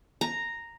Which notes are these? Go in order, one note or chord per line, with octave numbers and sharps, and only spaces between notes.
A#5